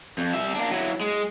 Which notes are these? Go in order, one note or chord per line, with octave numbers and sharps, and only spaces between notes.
F2
G3 E5
A#3 D4
F#3 E4
G#3